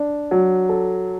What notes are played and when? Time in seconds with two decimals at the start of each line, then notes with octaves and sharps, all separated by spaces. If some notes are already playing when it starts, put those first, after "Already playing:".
Already playing: D4
0.31 F#3
0.69 A4